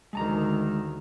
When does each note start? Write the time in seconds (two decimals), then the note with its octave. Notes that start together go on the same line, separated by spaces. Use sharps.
0.13 D2 D#3 G#3 A5 A#5